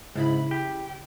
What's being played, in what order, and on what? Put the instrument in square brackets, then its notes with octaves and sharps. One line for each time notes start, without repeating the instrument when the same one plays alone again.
[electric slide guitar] G#2 [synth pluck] C#3 E4 B5
[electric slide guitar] G4